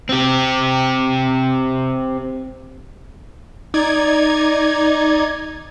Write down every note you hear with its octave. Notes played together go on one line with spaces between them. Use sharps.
C4 G4
D#4 D5 G#6